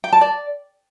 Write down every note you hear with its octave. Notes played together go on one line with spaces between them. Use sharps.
G5
A5
D5